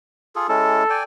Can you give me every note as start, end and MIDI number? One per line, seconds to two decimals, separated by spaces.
0.36 0.47 65
0.36 0.47 68
0.36 0.47 69
0.49 0.83 56
0.49 0.83 61
0.49 0.83 64
0.49 1.03 69
0.90 1.03 74
0.90 1.03 79
0.90 1.03 80